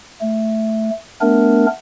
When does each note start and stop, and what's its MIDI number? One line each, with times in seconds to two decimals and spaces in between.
0.21 0.90 57
1.21 1.66 57
1.21 1.66 59
1.21 1.66 62
1.21 1.66 70